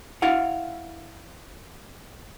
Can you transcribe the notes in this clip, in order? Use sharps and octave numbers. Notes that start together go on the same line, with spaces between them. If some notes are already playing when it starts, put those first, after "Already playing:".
E4 F5 F#5